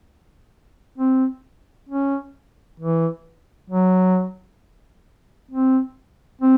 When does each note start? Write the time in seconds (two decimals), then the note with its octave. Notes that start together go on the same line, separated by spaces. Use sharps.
0.98 C4
1.89 C#4
2.80 E3
3.70 F#3
5.51 C4
6.42 C4